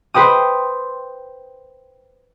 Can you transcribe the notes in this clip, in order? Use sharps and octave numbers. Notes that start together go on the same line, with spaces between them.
B4 C5 G5 D#6